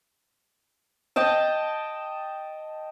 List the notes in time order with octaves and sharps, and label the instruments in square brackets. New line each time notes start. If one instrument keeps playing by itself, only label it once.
[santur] D#5 G5 A5